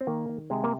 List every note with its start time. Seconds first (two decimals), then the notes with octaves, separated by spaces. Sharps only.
0.01 C4
0.07 D#3 A#3
0.29 D#3
0.50 C3 G#3
0.64 A#3